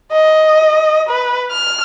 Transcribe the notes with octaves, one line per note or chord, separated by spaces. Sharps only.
D#5
B4
F6